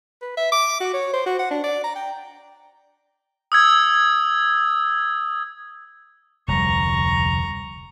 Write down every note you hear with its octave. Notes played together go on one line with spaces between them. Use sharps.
B4
E5
D6
F#4
C#5
C5
F#4
F#5
D4
D5
A#5
G5
D#6 E6 G#6
F1 D2 G3 A#5 C#6